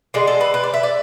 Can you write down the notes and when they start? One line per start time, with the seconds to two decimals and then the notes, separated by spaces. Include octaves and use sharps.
0.14 D3 G#3 G#4
0.27 A4
0.41 B4
0.54 B4
0.63 D5
0.74 E5
0.83 D5